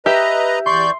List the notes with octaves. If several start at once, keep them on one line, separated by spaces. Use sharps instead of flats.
G4 B4 D#5 E5 A#5
E2 D5 C6 C#6 G6